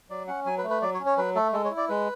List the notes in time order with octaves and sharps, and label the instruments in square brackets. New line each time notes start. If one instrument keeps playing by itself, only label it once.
[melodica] F#3 D5
C#4 F#5
F#3 G#5
B4
A3
B4
F#3 D5
C#5
C#4
C#5
F#3 B4
A3 A4
G#3 A4
C#5
E4
D5
G#3 B4